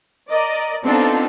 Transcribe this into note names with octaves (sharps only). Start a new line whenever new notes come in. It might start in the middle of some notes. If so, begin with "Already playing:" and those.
A#4 D5 D#5
B3 C4 D4 D#4 F4 A4